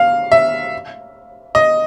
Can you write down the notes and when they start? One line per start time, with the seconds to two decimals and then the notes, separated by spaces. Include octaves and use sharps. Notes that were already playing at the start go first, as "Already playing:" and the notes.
Already playing: F5
0.32 E5
1.55 D#5